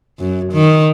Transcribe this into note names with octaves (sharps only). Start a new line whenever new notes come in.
F#2
D#3